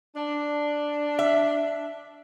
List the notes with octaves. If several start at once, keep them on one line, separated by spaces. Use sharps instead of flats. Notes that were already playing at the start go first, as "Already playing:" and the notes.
D4
E5